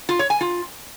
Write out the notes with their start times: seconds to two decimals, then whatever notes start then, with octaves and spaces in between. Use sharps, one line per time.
0.09 F4
0.19 C#5
0.30 G#5
0.41 F4